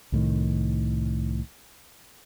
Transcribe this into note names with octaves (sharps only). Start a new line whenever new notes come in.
C2 A2 D#3